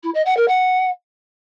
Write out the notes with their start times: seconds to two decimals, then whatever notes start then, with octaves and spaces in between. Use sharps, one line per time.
0.03 E4
0.14 D#5
0.25 F#5
0.36 A#4
0.48 F#5